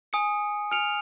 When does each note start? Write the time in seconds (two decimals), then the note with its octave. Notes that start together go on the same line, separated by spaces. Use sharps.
0.13 G#5 D#6 C#7
0.71 G#5 F6 C#7 F7